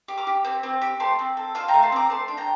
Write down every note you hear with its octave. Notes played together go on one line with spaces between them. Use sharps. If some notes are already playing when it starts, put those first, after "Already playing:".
G4
D6 F6
G4
C4
C4
G4
A3 A5 C6
C4
A4
F4 F5 A5
G5 A#5
A3
A5 C6
C4 A#5 D6
A3 A5 C6
D4
G5 A#5